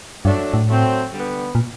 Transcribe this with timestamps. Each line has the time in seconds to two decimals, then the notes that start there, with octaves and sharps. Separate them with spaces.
0.25 G2 F#3 A3 D4
0.54 A2
0.69 F#3 A3 C4
1.12 D3 G3 B3
1.55 A#2